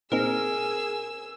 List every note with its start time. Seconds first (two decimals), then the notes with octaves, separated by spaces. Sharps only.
0.12 A#2 C4 D#4 G#4 A#4 G#5 E6